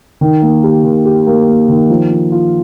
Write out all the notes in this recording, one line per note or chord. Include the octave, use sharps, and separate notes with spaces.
D#3
A#3
G4
D#3
G4
A#3
A#3
D#3
F3
F3
F4